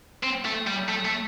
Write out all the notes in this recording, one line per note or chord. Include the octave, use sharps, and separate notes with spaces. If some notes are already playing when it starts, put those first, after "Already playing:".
C4
A3
G3
A3
A3